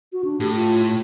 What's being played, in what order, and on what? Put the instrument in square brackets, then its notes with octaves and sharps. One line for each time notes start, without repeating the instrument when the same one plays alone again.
[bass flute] F#4
D4
[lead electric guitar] A2 [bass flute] G4
[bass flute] F4